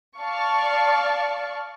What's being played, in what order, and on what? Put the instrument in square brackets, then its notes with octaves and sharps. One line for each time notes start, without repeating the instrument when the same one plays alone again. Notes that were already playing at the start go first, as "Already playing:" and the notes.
[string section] D5 F5 A5 C#6